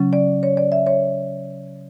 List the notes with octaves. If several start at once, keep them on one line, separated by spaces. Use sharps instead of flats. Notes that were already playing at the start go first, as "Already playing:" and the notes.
Already playing: C#3 F#3 C#4
D5
C#5
D5
E5
C#5